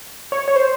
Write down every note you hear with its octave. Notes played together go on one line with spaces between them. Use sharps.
C#5
C#5
C5